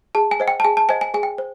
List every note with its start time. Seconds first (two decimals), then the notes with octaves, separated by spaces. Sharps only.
0.15 G#4 A5
0.31 G#5
0.40 C5 D#5 F#5
0.48 G5
0.60 A5
0.65 G#4 G#5
0.77 A5
0.89 C5 D#5 F#5 G#5
1.01 G#5
1.14 G#4 G#5
1.23 G5
1.38 C5